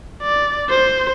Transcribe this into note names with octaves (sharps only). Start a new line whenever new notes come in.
D5
C5